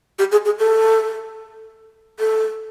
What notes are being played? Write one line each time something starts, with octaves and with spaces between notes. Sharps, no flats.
G4
G#4
G#4
A4
A4